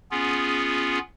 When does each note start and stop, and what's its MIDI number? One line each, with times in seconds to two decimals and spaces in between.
0.11 0.99 59
0.11 0.99 61
0.11 0.99 65
0.11 0.99 68